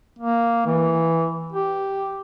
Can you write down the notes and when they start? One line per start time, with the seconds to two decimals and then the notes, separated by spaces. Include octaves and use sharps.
0.19 A#3
0.66 E3
1.52 G4